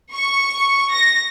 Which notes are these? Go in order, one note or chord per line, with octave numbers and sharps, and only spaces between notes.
C#6
A#6